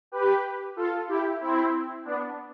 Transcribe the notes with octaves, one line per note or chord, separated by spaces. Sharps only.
G4 B4
F4 A4
E4 G4
C4 E4
B3 D4